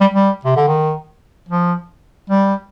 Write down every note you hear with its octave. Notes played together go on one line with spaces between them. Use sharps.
G3
G3
C3
D3
D#3
F3
G3